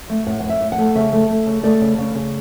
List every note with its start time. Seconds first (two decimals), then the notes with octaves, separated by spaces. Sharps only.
0.10 A3
0.26 A2 F#5
0.40 A2 F#5
0.49 E5
0.61 A2
0.72 F#5
0.78 A3
0.95 C#3 E5
1.13 A3
1.29 A3
1.46 C#3
1.63 A3 D5
1.81 C#3
1.98 C#3
2.15 C#3